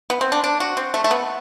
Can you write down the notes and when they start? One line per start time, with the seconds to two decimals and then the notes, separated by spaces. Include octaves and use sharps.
0.10 B3
0.21 C4
0.32 D4
0.44 D4
0.60 F#4
0.77 C4
0.94 A3
1.04 A3
1.11 B3